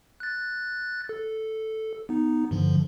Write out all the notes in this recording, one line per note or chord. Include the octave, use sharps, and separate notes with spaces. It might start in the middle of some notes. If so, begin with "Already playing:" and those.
F#6 A6
A4
B3 D#4
G2 D3 F3